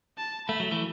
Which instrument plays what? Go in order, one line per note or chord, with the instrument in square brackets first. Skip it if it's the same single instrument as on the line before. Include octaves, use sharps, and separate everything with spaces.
[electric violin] A5
[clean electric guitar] A3 [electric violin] B5
[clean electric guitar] F#3
E3 A3